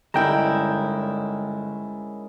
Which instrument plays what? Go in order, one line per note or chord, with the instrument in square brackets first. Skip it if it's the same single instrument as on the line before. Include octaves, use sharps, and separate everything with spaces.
[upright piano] G1 [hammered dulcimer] G#2 C#3 A#4 [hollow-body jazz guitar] D4 E4 [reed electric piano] G5 A#5